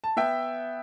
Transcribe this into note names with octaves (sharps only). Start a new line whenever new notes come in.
A5
B3 E5 G5